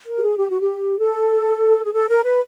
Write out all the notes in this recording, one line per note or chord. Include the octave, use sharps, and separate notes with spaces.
A#4
G4
G#4
G4
F#4
G4
A4
G#4
A4
A#4
B4